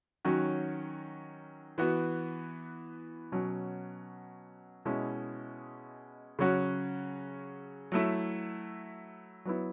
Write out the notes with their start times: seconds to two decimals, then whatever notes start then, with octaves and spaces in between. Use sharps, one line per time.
0.25 D#3 F#3 C#4 F#4
1.78 E3 B3 F#4
3.32 B2 F#3 C#4
4.85 B2 G#3 C#4 E4
6.39 C#3 F#3 C#4 F#4
7.92 F#3 A3 E4
9.45 F#3 B3 E4